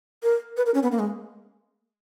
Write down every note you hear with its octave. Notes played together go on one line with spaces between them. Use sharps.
A#4
B4
A#4
C#4
B3
A#3
G#3